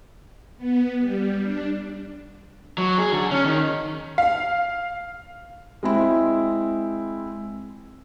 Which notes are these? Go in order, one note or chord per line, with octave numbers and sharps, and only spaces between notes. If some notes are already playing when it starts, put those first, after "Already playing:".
B3
G3
D4
F#3
G#4
D3
C#4
D#3
F5
G#3 C4 E4